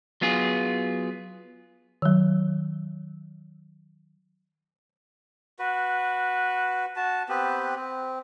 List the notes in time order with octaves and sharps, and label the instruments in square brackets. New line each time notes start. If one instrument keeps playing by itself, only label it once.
[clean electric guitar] F#3 B3 F4 G#4
[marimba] D#3 F#3
[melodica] F#4 B4
F#4 A5
B3 C4 G4 B4
C4